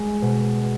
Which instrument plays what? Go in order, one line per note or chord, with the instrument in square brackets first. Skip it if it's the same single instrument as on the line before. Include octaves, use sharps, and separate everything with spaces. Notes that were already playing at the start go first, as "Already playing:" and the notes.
Already playing: [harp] G#3
B2